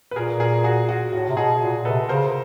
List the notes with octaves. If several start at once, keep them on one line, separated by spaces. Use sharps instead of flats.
B4
A#2 G#4 A#4
G#4 A#4
F#4 G#4
F#4
A2 F#4
C3
B2 F#4 G#4
A#2
C3 A4 B4
C#3 A#4 C5